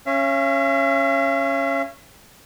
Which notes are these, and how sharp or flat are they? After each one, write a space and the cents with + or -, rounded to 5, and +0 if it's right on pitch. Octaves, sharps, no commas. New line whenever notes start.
C#4 -10 E5 +45